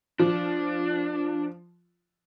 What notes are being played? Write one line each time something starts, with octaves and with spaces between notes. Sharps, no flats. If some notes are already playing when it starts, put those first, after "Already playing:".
F3 D4